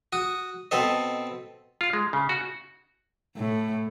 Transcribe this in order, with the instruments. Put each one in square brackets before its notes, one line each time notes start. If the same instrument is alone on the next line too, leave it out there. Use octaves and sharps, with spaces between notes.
[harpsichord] F#4 D#6
B2 C4 A4 D#5
[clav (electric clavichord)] F4
G#3
C#3
F#4
[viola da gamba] A2